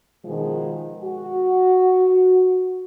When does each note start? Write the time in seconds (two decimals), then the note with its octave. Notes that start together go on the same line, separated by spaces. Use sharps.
0.25 B2 D#3 F3 G#3
1.03 F#4